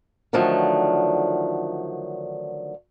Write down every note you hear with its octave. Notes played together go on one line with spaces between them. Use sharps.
D3 D#3 F3 F#3 A3